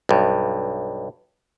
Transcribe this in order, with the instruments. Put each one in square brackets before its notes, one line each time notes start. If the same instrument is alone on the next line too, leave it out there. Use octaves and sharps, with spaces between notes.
[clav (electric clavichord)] B1 G2